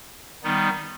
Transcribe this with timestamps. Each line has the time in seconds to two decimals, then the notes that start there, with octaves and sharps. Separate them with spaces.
0.43 D#3 G3 B3 D#4